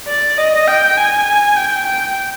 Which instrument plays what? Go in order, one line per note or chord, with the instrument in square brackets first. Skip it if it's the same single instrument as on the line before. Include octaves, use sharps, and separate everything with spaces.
[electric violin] D5
D#5
G5
G#5
G5
G5